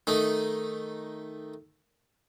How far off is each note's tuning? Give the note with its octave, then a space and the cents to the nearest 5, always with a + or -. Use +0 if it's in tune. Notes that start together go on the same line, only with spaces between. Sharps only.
D#3 +0 A3 +0 D#4 +0